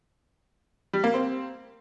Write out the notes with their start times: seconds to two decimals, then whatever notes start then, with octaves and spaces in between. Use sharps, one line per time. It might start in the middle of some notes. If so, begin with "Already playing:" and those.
0.93 G3
1.04 A#3
1.14 C4